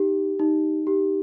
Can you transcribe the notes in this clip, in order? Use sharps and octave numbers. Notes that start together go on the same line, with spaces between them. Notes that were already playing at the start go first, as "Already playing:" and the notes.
Already playing: D#4 G4
D#4
G4